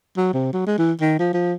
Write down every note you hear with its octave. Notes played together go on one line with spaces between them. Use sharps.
F#3
C3
F#3
G#3
E3
D#3
F3
F3